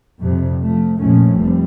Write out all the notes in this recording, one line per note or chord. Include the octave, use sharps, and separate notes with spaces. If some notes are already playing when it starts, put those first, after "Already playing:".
F2 C3 G3
F3 A3
A#1 F2 D#3 F3 A3 C#4
F1 G3 C4